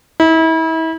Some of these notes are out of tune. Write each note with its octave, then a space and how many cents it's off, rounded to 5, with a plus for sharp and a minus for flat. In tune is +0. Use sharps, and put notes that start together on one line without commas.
E4 -35